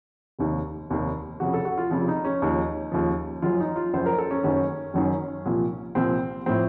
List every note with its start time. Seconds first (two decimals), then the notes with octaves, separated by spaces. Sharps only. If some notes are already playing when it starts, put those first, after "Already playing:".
0.39 F1 D#2 D#3
0.90 F1 D#2 D#3
1.40 F1 F2 C#3 F#4
1.53 A4
1.65 F#4
1.78 F4
1.91 F1 F2 C#3 F4
2.08 D#4
2.25 C#4
2.42 D#2 C#3 F3 D#4
2.92 D#2 C#3 F3
3.42 F#1 F#2 F3 F4
3.60 D#4
3.76 F4
3.93 F#1 F#2 F3 C5
4.06 A#4
4.18 A4
4.31 C#4
4.44 F#1 F#2 D#3 C#4
4.94 F#1 F#2 D#3
5.45 C2 A#2 F3
5.95 C2 A#2 F3 C4
6.46 A2 F3 C4